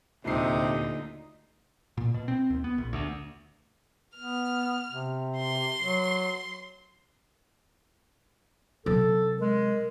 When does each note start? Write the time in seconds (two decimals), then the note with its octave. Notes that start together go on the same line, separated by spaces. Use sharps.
0.25 D#1 D2 C3 D#4 C7
1.97 A#2
2.14 B2
2.28 C4
2.50 D#2
2.64 B3
2.78 A#1
2.93 D2
4.17 B3 F6
4.91 C3
5.38 C6
5.79 F#3
8.86 C3 F#3 A4
9.39 G#3 A#4